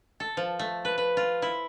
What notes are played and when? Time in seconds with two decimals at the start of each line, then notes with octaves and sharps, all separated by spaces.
0.20 A4
0.37 F3
0.59 A3
0.85 B4
0.98 B4
1.17 F4
1.42 E4